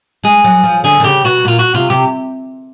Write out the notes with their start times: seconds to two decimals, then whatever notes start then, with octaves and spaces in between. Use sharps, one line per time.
0.24 G#3 G#4
0.44 F#3
0.64 F3
0.84 D3 G#4
1.00 D3
1.04 C#3 G4
1.24 B2 F#4
1.45 A#2 F4
1.59 F#4
1.74 C3 F4
1.90 C3 G4